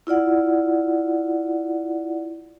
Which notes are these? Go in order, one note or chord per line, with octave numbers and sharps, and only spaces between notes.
E4 F4 D5 F#5